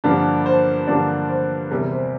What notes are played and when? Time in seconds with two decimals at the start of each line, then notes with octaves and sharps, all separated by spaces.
0.04 G2 D3 F3 A#3 D4 A#4
0.46 C5
0.87 G2 D3 F3 A#3 D4 D5
1.29 C5
1.71 E2 C3 G3 A#4
1.92 C5